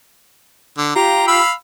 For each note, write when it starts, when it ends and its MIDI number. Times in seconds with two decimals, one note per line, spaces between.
0.78 0.90 50
0.95 1.38 65
0.95 1.38 67
0.95 1.26 82
1.27 1.52 77
1.27 1.52 83
1.27 1.52 88